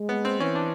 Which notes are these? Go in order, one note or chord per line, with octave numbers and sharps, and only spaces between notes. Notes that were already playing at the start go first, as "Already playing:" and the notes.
Already playing: G#3
B3
C4
E3 C#4
D4